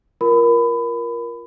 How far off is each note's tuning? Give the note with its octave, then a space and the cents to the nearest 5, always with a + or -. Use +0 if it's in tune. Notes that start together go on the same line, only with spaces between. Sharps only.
F4 +0 A#4 +15 B5 +20